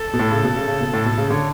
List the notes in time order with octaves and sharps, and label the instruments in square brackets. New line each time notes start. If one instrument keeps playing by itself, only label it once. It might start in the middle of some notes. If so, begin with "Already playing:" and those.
Already playing: [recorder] A4
[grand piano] B2
A2
C#3
B2
C#3
C#3
B2
A2
B2
C#3
[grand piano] D3 [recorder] C#5